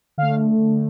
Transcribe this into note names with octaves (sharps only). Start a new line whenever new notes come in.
D3 A3 F5